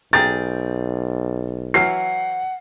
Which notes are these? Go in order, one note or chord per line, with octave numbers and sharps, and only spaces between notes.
B1 G#4 G5 A#5 A6
E3 F#3 F#5 F6 C7